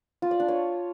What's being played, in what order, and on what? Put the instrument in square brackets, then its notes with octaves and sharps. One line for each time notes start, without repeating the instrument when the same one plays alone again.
[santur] F4
D5
D4
C#5